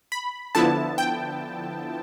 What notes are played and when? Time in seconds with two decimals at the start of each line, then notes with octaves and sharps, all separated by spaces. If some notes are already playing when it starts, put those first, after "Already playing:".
0.12 B5
0.55 D3 F3 B3 E4 A5
0.98 G5